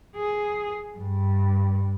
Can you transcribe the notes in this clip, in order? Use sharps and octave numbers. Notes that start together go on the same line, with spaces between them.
G#4
G2